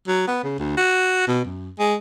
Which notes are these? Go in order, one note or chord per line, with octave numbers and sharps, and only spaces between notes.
F#3
B3
C#3
D2
F#4
B2
F#2
G#3